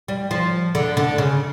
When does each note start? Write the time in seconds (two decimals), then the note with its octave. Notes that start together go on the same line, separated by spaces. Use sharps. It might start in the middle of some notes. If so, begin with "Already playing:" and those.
0.08 G3
0.31 F3
0.75 D3
0.97 D3
1.18 C#3